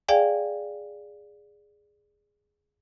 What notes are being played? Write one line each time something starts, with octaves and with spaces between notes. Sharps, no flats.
G#4 D5 F5 G5 G#5